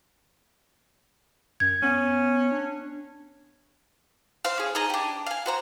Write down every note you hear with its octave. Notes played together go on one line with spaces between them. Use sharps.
F#2 G#6
B3 C#4
D4
C5 F5
C#4 G#4
D#4 G#4 D#5 A#5
D4 G4
F5 G#5
F#4 C5 A#5